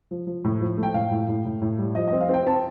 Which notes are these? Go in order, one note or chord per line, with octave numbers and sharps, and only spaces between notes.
F3
F3
A2
F3
A3
G5
A2 F5
A2
A2
A2
A2
G3
F3 D#5
D#5
C4
F5
C4 G5
C4 A5